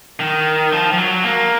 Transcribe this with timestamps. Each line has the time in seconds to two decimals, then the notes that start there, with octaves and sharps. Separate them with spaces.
0.20 D#3
0.72 F3
0.93 F3
0.98 F#3
1.24 A#3